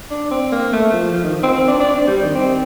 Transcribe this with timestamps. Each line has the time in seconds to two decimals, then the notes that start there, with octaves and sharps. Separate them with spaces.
0.10 D4
0.31 C4
0.52 A#3
0.73 A3
0.93 F3
1.13 F3
1.23 D#3
1.43 C4
1.53 C4
1.68 D4
1.80 D4
1.94 C4
2.07 G3
2.22 D#3
2.35 C4